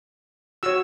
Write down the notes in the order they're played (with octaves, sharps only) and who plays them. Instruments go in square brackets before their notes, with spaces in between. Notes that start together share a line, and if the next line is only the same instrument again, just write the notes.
[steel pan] F#4 C#5 E6